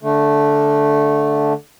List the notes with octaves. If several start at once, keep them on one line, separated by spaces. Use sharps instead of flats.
D3 A3